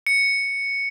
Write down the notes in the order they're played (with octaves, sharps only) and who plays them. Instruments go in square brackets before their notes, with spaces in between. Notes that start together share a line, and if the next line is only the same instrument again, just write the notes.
[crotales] C#7